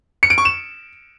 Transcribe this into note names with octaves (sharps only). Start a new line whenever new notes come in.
C#7
D7
C#6
E7